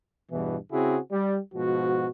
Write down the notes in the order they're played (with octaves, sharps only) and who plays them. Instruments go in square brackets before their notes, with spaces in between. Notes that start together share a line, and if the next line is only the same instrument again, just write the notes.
[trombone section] E2 G2 B2 E3
C#3 C4 E4 F#4 G#4
G3
G#2 B2 F3 F#4